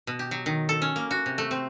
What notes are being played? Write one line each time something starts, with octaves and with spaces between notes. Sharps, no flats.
B2
G4
F#3
D#3
A4
C#4
A#3
F#4
C3
A3
C4